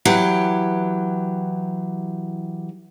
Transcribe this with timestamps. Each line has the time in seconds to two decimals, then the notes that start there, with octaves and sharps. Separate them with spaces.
0.05 E3 F#3 G4